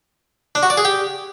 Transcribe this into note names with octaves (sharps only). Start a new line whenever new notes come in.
D4
F#4
D5
G#4
G4